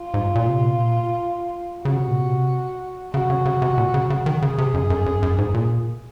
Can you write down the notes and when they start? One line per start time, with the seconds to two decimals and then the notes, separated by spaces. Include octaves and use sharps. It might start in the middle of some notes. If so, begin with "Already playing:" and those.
Already playing: F4
0.14 G#2
0.35 A#2
0.49 C3
0.63 A#2
1.85 C#3 F#4
1.97 C3
2.08 A#2
2.20 C3
3.13 C#3 F#4
3.30 C#3
3.46 C#3
3.62 C3
3.78 A#2
3.94 C#3
4.10 C#3
4.26 D#3
4.42 C#3 G#4
4.58 C3
4.74 F#2
4.90 F#2
5.06 F#2
5.22 F#2
5.38 G#2
5.54 A#2